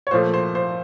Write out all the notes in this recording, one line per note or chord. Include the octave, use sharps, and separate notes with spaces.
C#5
A#2 F3 A3 C5
C5
C5